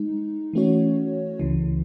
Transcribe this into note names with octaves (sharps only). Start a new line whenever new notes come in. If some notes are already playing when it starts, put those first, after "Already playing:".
Already playing: G#3 D#4
E3 A3 C#4 F#4 C#5
C#2 C#3 E3